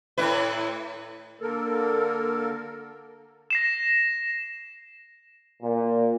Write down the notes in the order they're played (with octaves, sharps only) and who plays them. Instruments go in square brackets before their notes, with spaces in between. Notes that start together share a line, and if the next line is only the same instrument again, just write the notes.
[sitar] A2 E4 B4
[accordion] D3 A#3 A4 A#4
[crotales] A#6 C7 E7
[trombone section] A#2